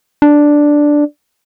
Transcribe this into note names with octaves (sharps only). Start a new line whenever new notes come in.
D4